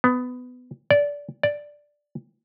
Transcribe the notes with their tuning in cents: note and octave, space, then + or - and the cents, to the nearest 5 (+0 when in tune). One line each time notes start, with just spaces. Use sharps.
B3 +20
D5 -20
D5 +0